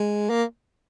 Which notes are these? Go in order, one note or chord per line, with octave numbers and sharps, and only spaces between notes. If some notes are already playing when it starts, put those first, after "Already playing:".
Already playing: G#3
A#3